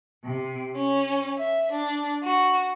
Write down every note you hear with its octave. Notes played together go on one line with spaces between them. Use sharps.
C3
C#4
E5
D4
F#4